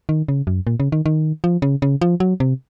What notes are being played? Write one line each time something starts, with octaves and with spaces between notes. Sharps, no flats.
D#3
C#3
F#2
A#2
C#3
D#3
D#3
F3
C#3
C#3
F3
F#3
C3